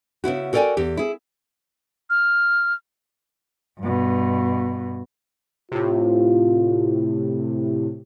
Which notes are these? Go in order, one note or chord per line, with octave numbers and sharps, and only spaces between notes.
C#3 B3 E4 F#4
F#4 A4 A#4 D5 G5 G#5
E2 G4
E4 G#4
F6
G2 B2
A2 C3 F4